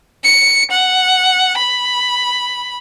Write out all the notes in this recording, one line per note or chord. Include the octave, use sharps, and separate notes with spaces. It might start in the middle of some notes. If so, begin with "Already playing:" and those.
C#7
F#5
B5